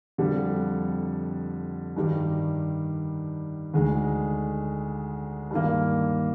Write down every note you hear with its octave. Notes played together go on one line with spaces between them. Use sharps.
F2 D3 G3
G2 D#3 G3
D2 D3 G#3 D#4
G2 D#3 A#3